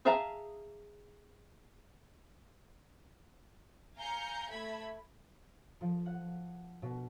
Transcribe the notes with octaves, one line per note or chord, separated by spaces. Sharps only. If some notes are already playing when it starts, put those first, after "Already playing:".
G#4 E5 F5 A5 A#5
F5 G#5 A#5 G6 C#7
A3 E5 B5 G#6 B6
F3
F#5
B2